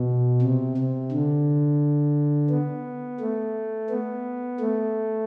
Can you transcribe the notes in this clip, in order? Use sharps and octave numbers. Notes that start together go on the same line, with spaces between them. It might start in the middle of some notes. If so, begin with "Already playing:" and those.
Already playing: B2
C3
C3
D3
B3
A3
B3
A3